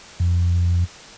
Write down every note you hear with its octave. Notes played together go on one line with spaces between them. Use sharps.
F2